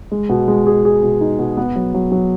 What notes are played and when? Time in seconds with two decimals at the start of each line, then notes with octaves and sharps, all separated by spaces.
0.12 G#3
0.29 B2
0.48 G#3
0.67 G#4
0.85 G#4
1.03 B2
1.21 D#4
1.39 B2
1.57 B3
1.76 F#3
1.94 F#3
2.12 F#3